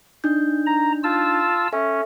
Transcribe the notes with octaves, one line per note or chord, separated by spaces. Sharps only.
D4 D#4 G6
A#5
F4 A5 E6
C#4 A4 E5